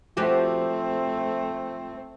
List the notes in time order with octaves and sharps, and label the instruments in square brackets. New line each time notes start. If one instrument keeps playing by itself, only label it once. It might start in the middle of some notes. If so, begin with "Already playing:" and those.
[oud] F3 F#4 G4 [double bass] A3 C4